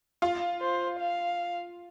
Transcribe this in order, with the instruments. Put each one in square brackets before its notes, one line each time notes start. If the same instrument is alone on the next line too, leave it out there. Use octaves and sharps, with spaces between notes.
[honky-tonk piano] F4
[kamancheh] C5
F5